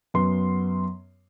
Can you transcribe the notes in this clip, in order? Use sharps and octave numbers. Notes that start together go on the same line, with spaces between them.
F#2 B3 C6